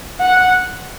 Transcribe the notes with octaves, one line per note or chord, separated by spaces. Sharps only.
F#5